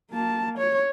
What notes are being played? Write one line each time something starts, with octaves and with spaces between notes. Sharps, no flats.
A#3 A5
C#5